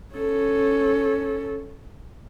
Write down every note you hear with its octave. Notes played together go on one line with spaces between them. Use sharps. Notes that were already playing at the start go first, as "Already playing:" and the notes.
C#4 A4